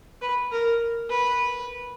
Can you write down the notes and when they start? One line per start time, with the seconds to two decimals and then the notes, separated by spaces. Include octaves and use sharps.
0.22 B4
0.51 A#4
1.09 B4